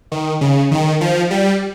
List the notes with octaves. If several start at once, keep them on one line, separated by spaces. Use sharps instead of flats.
D#3
C#3
D#3
F3
G3